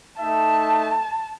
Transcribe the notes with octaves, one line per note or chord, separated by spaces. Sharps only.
A3 D#4 E5 A5